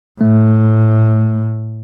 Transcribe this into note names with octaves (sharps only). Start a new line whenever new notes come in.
A2 A3